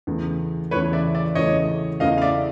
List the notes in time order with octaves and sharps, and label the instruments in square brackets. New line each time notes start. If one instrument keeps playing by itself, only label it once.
[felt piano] E2 C#3 E3 A3
[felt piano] E2 C#3 E3 A3 [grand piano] B4 C#5
[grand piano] D5 E5
D5 E5
[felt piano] E2 C#3 E3 A3 [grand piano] C#5 D#5
[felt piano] E2 C#3 E3 A3 [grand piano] D#5 F5
[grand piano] F5
D5 E5